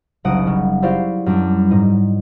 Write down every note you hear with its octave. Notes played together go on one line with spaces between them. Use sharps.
F#1 C2 D#4 F#5 D#6 D7
C#3
E4 F#4 G4 C5 D5 F5
F#2 G3 D4
G#2 D#4